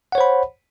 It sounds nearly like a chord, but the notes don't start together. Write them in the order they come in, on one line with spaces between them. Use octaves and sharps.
F#5 C#5 C5 B5